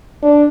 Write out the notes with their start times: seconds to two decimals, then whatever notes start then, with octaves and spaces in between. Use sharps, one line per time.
0.23 D4